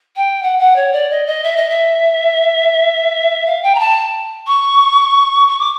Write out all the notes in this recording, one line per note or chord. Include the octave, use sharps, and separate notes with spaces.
G5
F#5
F#5
C#5
D5
D#5
D#5
E5
D#5
E5
F5
G5
A#5
A5
C#6
C#6
D6